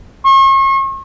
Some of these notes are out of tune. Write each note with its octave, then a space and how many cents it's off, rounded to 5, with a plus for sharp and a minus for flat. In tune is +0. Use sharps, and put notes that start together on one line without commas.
C#6 -40